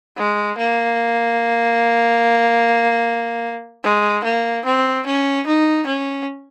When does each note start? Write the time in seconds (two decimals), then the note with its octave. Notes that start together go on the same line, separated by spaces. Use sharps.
0.17 G#3
0.58 A#3
3.84 G#3
4.24 A#3
4.65 C4
5.06 C#4
5.47 D#4
5.87 C#4